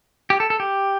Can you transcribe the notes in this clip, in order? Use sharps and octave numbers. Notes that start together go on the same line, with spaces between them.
G4
A4
A4
G4